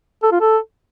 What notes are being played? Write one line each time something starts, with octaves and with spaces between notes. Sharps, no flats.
A4
F4
A4